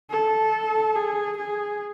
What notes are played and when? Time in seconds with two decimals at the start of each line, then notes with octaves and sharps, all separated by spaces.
0.10 A4
0.96 G#4
1.38 G#4